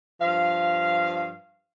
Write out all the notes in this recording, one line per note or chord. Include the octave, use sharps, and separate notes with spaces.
G2 F3 F5